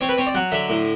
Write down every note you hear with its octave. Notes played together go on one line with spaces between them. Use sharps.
C4 C#5
B4
C4 C#5
D5
F#3 F#5
D3 E5
A2